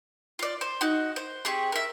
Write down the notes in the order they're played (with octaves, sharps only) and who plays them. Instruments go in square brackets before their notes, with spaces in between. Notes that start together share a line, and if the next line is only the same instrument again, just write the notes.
[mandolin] F4 D5
C5
D#4 F#4
C5
C4 G4 G#4 C#6
A#4 E5